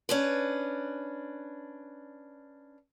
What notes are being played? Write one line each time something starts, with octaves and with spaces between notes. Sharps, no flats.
C#4 D4 B4